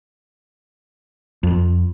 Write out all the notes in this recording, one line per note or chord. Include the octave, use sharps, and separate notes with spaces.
F2